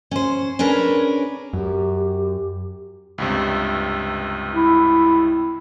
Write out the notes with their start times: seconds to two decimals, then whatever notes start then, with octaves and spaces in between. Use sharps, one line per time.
0.11 C#4 C5
0.59 C#4 D4 G#4 A#4 B4
1.53 F#2 G4
3.18 C#2 G2 C3
4.53 E4